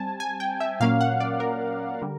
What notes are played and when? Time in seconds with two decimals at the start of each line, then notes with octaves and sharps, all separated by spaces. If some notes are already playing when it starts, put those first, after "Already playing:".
Already playing: G3 C4 G#5 A5
0.20 G#5
0.40 G5
0.60 E5
0.80 A#2 F#3 A#3 C#4 F5
1.01 F#5
1.20 D5
1.40 A#4
2.02 D3 G3